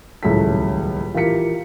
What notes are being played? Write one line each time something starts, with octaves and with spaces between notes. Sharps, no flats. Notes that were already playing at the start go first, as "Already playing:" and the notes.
D#1 C#2 A2 F#3 A4 B6
E3 F4 G4 A#4 B6 C#7